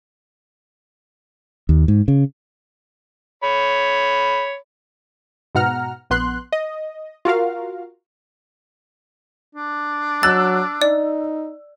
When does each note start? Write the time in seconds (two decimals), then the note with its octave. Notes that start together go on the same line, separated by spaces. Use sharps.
1.69 D#2
1.88 G#2
2.08 C#3
3.43 C#5 B5
5.55 G#2 B2 F#5 A#5 F6
6.10 A#1 B3 C6 F#6
6.52 D#5
7.25 F4 F#4 A#4 F5
9.55 D4
10.23 F#3 E6 F#6 A6
10.82 D#4 D5